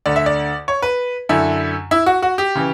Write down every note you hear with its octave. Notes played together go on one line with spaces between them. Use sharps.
D2 D3 D5
E5
D5
C#5
B4
F#2 D3 E4
E4
F#4
F#4
G4
C#3 E3